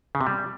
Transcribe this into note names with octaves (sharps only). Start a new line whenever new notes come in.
C#3
C3
G3